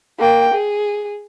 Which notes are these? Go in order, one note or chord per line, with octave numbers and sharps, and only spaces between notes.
A#3 G5
G#4